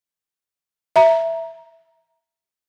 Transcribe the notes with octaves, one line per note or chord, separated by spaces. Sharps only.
E5 A#5